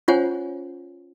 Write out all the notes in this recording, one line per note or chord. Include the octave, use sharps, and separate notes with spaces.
C#4 F4 C5 C#5 F#5 G#5